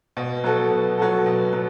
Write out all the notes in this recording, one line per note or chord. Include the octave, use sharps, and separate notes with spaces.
B2
F#3 B3 F#4 A4
B2
F#3 B3 F#4 A4
B2
F#3 B3